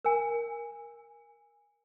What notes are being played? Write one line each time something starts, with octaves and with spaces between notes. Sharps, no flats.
A#4 G#5